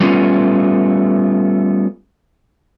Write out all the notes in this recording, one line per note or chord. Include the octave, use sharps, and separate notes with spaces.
G3 A3 B3 C#4 F4